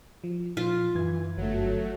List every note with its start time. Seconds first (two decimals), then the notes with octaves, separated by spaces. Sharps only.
0.24 F3
0.57 A#2 F3 F4
0.95 F#2 E3 G#6
1.37 G1 F#3 A3